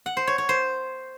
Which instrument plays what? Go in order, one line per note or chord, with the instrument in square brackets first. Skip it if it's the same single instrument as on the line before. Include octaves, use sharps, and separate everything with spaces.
[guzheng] F#5
C5
C#5
C#5
C5